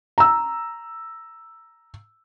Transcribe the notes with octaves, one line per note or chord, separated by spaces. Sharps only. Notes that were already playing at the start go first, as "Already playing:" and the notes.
A#5 E6